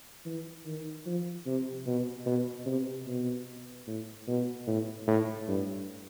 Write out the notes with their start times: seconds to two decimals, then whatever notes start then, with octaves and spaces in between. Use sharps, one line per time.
0.26 E3
0.66 D#3
1.06 F3
1.46 C3
1.86 B2
2.26 B2
2.66 C3
3.07 B2
3.87 A2
4.28 B2
4.67 A2
5.08 A2
5.48 G2